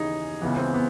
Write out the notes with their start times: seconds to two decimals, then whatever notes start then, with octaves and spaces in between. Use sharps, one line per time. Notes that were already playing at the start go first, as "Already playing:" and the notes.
Already playing: D#2 C#3 E3 D#4 G#4
0.42 C#2 C#3 E3 B3
0.57 C4
0.74 B3